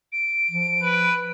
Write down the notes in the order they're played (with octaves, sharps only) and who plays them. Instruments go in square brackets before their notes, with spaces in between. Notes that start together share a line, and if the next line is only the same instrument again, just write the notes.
[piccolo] D7
[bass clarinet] F3
[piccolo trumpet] B4